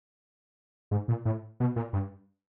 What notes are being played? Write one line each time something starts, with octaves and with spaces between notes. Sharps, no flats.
G#2
A#2
A2
B2
A#2
G2